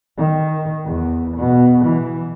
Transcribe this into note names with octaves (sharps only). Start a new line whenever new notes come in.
D#3
E2
B2
E3